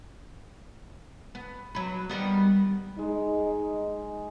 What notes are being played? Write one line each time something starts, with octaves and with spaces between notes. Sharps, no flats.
B3
F#3 B4
D#3 G3 B3
G#3 D#4